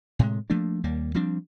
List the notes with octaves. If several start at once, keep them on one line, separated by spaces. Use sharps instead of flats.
A2 C3 G#3
F3 A3 A#3 D4
D#2 G3 A#3
F3 G3 C4 D4